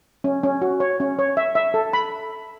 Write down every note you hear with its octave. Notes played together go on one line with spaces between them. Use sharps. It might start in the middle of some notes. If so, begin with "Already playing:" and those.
C#4
C#4
F#4
C#5
C#4
C#5
E5
E5
A4
B5